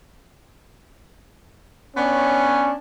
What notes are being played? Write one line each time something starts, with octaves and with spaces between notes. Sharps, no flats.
B3 C#4 D4 C#5